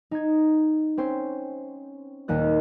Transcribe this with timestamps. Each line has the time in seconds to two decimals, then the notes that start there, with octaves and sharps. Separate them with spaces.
0.11 D#4 G#6
0.97 C4 C#4 C5
2.28 D#1 D#2 A#3 D#5 F#6